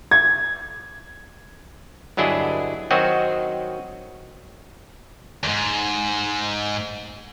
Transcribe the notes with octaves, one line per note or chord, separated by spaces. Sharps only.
G#6
G1 F#3 D4 E4 G#4 D#5
D#3 F#3 C4 F#4 D#5
E2 G#2